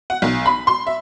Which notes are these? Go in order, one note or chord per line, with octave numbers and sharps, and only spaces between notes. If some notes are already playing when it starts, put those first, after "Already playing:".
F#5
B1
B5
C6
E5